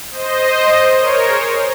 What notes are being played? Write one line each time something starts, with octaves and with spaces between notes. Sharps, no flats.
C5 D#5
A#4 C#5
G#4 C5